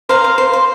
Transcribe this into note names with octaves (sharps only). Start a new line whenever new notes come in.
C5 F5 A#5
C5
C5
C5